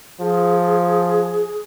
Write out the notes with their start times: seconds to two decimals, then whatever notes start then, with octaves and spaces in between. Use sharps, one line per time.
0.20 F3 G#4